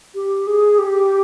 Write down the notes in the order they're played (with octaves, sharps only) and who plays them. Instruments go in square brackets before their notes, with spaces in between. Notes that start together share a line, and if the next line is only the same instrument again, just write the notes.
[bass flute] G4
G#4
G4